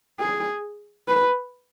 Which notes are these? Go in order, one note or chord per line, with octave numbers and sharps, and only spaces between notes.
G#4
B4